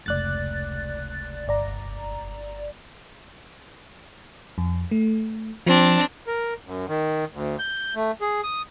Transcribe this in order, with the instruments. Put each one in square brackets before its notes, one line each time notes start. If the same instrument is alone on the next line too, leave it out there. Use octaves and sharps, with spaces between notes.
[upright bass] F1 C#2 [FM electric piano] D5 F#6 A6
[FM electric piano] G1 D5 A#5
F2
A3
[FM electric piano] F3 [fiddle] C4 D4
[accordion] A#4
F#2
D#3
D2
G6
A3
G#4
D#6